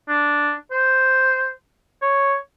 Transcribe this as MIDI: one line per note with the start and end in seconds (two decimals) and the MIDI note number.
0.08 0.53 62
0.71 1.50 72
2.02 2.35 73